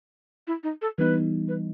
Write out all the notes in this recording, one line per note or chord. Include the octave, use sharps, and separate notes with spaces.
E4
D#4
A4
E3 G3 B3 D#4 B4
B4